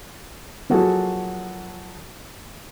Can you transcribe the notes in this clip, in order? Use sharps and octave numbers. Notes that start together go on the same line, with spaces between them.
F3 F#3 A#3 F#4 G#4 A4